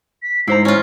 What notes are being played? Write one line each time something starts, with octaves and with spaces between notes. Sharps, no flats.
B6
G#2 E4 C5 A#5 C7
C#4 F4 F6